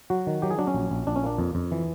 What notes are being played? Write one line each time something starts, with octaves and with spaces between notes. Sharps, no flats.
F#3 F#4
D#3
F#3 G4
G#4
F#3 D4
C#4
A#1
A#1
A#1 D4
C#4
A#3 D4
F2
F2
E3